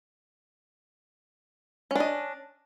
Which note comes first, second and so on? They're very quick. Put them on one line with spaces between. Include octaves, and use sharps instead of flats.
C#4 D4 D#5